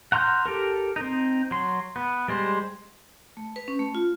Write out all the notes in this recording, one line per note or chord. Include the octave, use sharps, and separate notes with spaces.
F#5 A#5 C6 F6 G6
G4 A4 A#4
C4 D#4
F#3 C6
B3
G3 G#3 C5
A3
B4
C#4
A3
F4